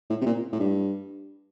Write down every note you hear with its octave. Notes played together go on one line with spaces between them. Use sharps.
A2
C3
A#2
A2
G2